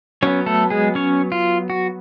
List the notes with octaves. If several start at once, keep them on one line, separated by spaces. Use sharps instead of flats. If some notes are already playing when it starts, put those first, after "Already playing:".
F#3 B3 C#4 C#5
A3 A4
G#3 G#4
C#4 C#5
F4
F#4